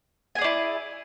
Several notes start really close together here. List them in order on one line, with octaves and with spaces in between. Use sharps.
G#5 G#4 D5 E4